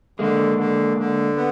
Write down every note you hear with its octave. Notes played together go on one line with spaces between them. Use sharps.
D3 G#3 A#3
D3
D3
B3